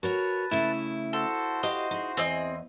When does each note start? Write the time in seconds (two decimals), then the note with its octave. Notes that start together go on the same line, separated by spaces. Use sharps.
0.03 F#4 A#4 B4 C#5 A5
0.51 C#3 A3 E4 G#5
1.13 F#4 A4 C5
1.63 G4 D#5 F5
1.91 D#4 G#4
2.17 E2 C4 G#4 D#5